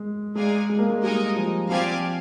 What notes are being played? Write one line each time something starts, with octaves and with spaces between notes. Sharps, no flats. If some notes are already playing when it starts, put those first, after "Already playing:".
Already playing: G#3
G#3 D#4 G#4 D5 F5 G#5
G#3
A#3
G#3
G3 D#4 A#4 D#5 G#5
F3
F3 C4 G4 D5 F5 G#5